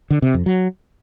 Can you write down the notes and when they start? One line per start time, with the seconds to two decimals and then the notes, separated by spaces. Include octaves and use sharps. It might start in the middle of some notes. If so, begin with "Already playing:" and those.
0.10 D3
0.22 C3
0.34 F2
0.46 F#3